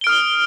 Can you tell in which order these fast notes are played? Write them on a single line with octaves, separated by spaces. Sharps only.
G7 D7 F6 D#6